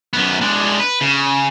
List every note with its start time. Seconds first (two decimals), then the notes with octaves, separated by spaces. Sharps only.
0.13 F#2 B3
0.41 G#3 D4
0.80 B4
1.01 C#3